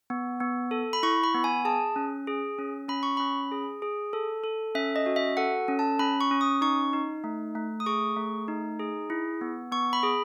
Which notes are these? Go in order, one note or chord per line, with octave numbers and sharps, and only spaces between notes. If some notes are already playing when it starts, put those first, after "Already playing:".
B3
B3
A4
B5
E4 C#6
B5
B3
G#5
G#4 A5
C#4
G#4
C#4
C#4 B5
C#6
C#4 B5
G#4
G#4
A4
A4
C#4 E5
D#5
F#4
E5
A4 F#5
C#4
A5
C#4 B5
C#6
C#4
D#6
D#4 C#6
D#4
A3
A3
D#6
G#4 C#6
A3
D#4
G#4
E4
B3
B3 C#6
B5
G#4